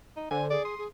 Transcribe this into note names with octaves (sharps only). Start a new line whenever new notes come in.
D#4
D3 C5 G#5
G#4 D5
C6 D#6
G#4